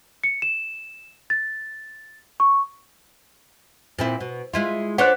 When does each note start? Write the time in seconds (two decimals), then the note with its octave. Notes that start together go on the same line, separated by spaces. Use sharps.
0.24 C#7
0.42 E7
1.30 A6
2.40 C#6
3.99 A#2 C4 E4
4.21 B2
4.54 G#3 E4 F4
4.98 D4 C5 C#5 F#5 F#6